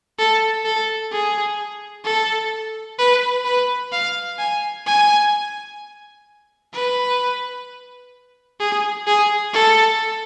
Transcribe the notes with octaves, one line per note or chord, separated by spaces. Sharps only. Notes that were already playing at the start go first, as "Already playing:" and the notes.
A4
A4
G#4
A4
B4
B4
F5
G#5
G#5
B4
G#4
G#4
A4